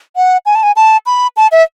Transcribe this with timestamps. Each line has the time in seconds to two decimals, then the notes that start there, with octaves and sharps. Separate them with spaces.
0.16 F#5
0.46 G#5
0.55 A5
0.63 G#5
0.76 A5
1.06 B5
1.37 A5
1.52 E5